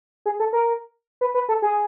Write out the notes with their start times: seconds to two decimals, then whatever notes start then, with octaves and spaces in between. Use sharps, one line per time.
0.26 G#4
0.40 A4
0.53 A#4
1.21 B4
1.34 B4
1.49 A4
1.62 G#4